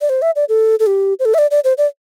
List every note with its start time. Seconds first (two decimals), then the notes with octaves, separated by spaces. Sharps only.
0.01 D5
0.09 C5
0.22 E5
0.36 D5
0.49 A4
0.80 A4
0.87 G4
1.19 C5
1.25 A4
1.34 E5
1.38 D5
1.51 D5
1.64 C5
1.78 D5